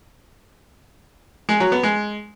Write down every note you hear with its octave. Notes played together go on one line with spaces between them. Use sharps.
G#3
F#3
B3
G#3